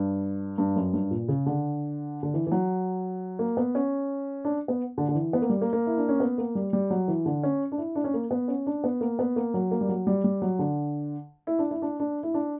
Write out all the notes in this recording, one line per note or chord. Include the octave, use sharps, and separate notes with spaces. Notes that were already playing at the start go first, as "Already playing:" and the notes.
Already playing: G2
G2
F#2
G2
A#2
C#3
D3
D3
E3
E3
F#3
A#3
B3
C#4
D4
B3
D3
D3
E3
B3
A#3
G3
A#3
A#3
E4
D4
C#4
B3
A#3
G3
G3
F#3
E3
D3
C#4
D4
E4
D4
C#4
A#3
B3
C#4
D4
B3
A#3
B3
A#3
F#3
A#3
G3
F#3
G3
G3
F#3
D3
E4
D4
E4
D4
D4
E4
D4